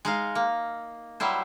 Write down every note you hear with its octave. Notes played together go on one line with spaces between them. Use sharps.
G#3 D#4 F5
A#3
F#3 G3 E4 C5